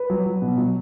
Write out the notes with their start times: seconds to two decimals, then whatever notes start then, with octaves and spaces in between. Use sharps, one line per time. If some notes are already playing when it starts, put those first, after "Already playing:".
Already playing: B4
0.10 F#3
0.26 F#3
0.42 B2
0.58 F#3